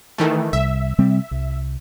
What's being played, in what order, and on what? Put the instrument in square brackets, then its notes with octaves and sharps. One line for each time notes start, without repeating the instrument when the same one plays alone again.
[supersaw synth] D#3 E3 A3
[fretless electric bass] C2 [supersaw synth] E5
[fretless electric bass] C3 G3 C4
C2